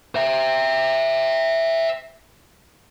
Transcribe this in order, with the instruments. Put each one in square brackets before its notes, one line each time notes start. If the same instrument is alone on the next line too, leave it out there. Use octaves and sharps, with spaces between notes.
[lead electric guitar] C5 E5